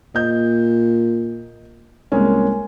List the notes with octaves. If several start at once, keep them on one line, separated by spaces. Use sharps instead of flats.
A#2 D#5 G6
C2 G#3 A#3 C#4